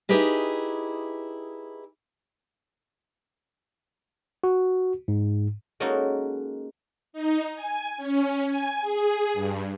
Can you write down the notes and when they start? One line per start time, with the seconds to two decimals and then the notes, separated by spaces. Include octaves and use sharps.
0.09 D#4 E4 G4 G#4 B4 D#5
4.44 F#4
5.08 G#2
5.80 G#3 A#3 C#4 D#4 F#4 A4
7.13 D#4
7.55 G#5
7.97 C#4
8.45 G#5
8.81 G#4
9.33 G2